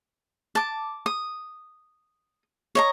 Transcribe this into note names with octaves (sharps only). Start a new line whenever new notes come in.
A5 D6
D#6
C#5 D#5 A#5